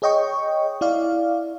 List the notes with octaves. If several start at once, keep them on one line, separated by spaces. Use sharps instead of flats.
G#4 C#5 D#5 G5 C#6
E4 D5 F5